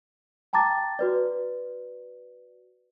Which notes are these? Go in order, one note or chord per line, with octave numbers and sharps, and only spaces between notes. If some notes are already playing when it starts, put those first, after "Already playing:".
G5 A5 A#5 D6 A6
F#4 B4 D5